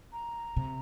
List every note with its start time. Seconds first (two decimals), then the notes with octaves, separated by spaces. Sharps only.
0.13 A#5
0.57 C3